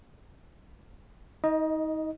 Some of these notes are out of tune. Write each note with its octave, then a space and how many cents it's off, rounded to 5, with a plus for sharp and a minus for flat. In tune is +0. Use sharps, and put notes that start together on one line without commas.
D#4 +30 D#5 +0